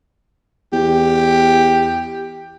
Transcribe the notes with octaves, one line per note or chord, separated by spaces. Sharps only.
E2 G4